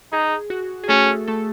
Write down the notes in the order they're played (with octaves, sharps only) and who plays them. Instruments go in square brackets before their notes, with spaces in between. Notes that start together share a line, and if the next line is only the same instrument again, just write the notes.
[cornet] D#4 [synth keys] G#4
[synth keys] F#4
G#4
[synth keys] A3 A4 [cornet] C#4
[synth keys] A3 A4